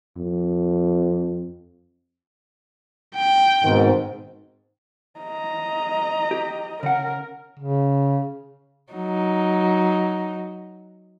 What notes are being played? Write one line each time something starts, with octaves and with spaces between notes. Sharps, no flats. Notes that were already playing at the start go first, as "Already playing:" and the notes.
F2
G5
G#2 B2 D#3 C4
D#5 A#5
G4
C#3 A#4 F#5
C#3
F#3 D#4